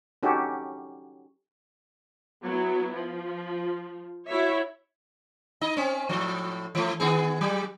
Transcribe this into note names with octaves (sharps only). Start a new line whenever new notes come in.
C#4 D#4 F#4 G4 A4
F#3 B3 E4
F3
E4 F#4 C#5 E5
D#4 D#5
C4 C#4
A2 F3
E3 A3
D#3 B3 G#4
F#3 G3